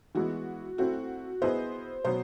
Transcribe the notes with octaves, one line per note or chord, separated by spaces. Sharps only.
E3 G#3 B3 E4 F#4
A3 C4 E4 F#4
B3 E4 G#4 B4 C5 D#5
B2 F#3 B3 C5